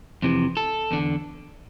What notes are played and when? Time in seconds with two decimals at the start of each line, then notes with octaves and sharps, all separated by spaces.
0.22 F2 C3 E3
0.57 A4
0.91 E2 D3